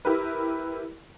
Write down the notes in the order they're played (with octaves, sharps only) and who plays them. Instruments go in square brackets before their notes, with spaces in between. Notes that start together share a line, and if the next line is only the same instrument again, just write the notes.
[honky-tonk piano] E4 G4 A#4 B4